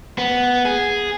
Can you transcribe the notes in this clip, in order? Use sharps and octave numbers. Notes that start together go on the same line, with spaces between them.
B3
G#4